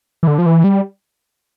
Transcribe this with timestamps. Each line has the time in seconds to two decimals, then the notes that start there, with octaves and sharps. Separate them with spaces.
0.23 E3
0.27 D3
0.38 F3
0.46 E3
0.64 G3